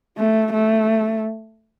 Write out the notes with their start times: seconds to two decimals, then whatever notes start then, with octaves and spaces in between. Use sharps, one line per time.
0.18 A3
0.53 A3